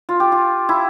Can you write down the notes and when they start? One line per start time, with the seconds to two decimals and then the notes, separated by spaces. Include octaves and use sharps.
0.09 F4
0.20 G4
0.32 F4
0.69 E4